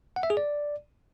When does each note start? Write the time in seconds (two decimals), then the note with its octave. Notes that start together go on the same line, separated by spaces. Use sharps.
0.16 F#5
0.23 E5
0.30 G#4
0.37 D5